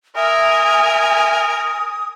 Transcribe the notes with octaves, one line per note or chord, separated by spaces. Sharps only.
A#4 E5 G#5 D#6